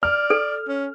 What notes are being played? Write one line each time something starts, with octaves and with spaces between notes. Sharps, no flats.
D5 F6
A4
C#4